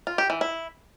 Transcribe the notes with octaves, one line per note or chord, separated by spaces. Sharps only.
F4
G4
E3
E4